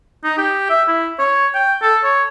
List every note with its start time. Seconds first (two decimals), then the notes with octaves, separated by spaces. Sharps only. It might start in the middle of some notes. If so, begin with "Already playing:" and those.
0.24 D#4
0.38 G4
0.70 E5
0.88 E4
1.19 C#5
1.54 G5
1.82 A4
2.04 C#5